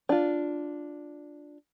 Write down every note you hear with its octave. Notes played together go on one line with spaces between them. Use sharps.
D4 F4